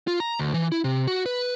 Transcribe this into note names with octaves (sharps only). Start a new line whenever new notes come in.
F4
A#5
D2
E3
E4
C3
F#4
B4